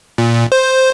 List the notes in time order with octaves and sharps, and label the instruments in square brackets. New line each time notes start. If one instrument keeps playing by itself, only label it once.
[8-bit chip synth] A#2
C5